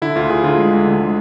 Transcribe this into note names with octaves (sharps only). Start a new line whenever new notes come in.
D3 E4
D2 F4
D2 G#4
D3 F4
G#3
D2
D3
G#3